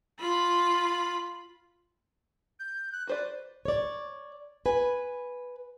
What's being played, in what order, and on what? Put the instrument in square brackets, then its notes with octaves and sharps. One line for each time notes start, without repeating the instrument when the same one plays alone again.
[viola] F4 B5
[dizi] G6
F#6
[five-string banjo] F#4 C5 D5 [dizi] B4
[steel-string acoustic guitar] C#5 D5
B4 G#5